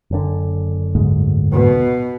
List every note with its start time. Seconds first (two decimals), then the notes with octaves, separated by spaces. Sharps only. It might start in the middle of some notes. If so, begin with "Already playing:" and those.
0.11 F#1 D3
0.95 D2 G#2
1.52 B2